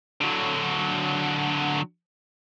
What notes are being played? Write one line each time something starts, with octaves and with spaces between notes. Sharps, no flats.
D3 F#3